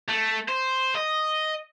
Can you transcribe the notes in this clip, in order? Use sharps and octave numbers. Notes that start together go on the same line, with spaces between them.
A3
C5
D#5